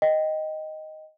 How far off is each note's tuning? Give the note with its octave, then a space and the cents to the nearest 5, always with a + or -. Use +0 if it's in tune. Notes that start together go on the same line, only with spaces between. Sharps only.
D#5 +0 G5 -5